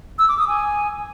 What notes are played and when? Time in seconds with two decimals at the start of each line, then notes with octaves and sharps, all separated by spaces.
0.19 E6
0.29 D6
0.38 D#6
0.48 G#5